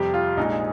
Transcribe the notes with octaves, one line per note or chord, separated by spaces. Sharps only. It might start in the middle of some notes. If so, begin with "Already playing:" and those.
Already playing: F2 C3 G3 G4
F4
A#1 A#2 G#3 D#4